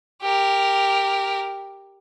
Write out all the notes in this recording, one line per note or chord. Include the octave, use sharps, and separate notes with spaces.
G4 A#4